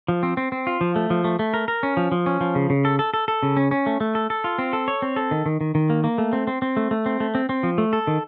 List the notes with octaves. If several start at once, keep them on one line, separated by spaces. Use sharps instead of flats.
F3
C4
C4
C4
F4
F3
A3
F3
A3
A3
A#4
A#4
C#4
F3
F3
C#4
F3
C#3
C#3
A4
A4
A4
A4
C#3
C#4
C#4
A3
A3
A4
A4
F4
C4
A4
C#5
C4
A4
D#3
D#3
D#3
D#3
A#3
A#3
A3
C4
C4
C4
A3
A3
C4
A3
C4
C4
F3
A3
A4
D#3